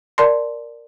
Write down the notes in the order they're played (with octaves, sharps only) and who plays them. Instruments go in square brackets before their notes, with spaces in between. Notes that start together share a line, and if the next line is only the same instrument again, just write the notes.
[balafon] A#4 D5 A5 C6